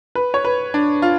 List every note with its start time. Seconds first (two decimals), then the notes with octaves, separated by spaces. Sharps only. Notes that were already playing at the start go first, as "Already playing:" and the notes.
0.15 B4
0.34 C#5
0.45 B4
0.74 D4
1.02 F4